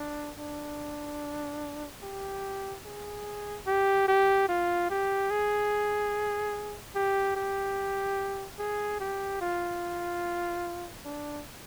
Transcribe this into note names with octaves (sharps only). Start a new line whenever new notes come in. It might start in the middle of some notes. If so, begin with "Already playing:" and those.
Already playing: D4
D4
G4
G#4
G4
G4
F4
G4
G#4
G4
G4
G#4
G4
F4
D4